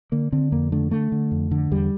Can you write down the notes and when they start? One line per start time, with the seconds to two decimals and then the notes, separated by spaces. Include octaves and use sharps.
0.12 D3 A#3
0.32 D3 C4
0.52 F2 A#3
0.72 D3 A3
0.91 D3 A3
1.12 D3
1.32 F2
1.51 D3
1.71 E2 G3